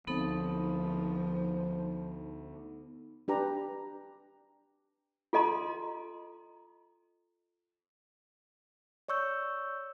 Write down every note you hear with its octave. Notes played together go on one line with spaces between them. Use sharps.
D2 F3 B3 C4 D#4 A4
D4 G4 B4 A#5
F4 A4 D#5 A#5 C6
C#5 D5 C#6 E6 G6